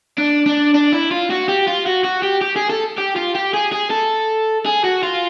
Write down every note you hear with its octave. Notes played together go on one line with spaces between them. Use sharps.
D4
D4
D4
E4
F4
F#4
G4
F4
F#4
F#4
G4
G4
G#4
A4
G4
F4
G4
G#4
G#4
A4
G#4
F#4
F4